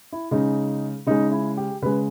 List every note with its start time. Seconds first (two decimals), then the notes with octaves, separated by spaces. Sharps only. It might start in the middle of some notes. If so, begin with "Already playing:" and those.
0.12 E4
0.31 C#3 G#3 D#4
1.07 C#3 G#3 D#4
1.31 E4
1.57 G4
1.82 C#3 G#3 B4